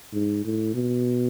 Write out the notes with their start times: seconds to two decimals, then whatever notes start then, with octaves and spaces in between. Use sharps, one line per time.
0.13 G#2
0.44 A2
0.74 B2